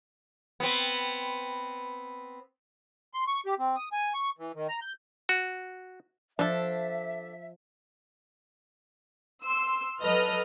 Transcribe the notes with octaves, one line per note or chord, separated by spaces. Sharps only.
B3 C4
C6
C#6
G4
C4
D#6
G#5
C#6
E3
D#3
A#5
G6
F#4
F3 D4 A4 E5
C6 E6
F#3 A4 B4 D#5 F6 A#6